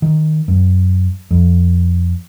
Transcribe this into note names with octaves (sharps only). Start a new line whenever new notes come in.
D#3
F#2
F2